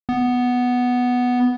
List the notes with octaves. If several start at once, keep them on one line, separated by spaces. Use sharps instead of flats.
B3